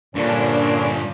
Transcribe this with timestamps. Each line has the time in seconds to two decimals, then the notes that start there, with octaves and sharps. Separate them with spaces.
0.15 G2 A#2 D3 F3 C#4 D4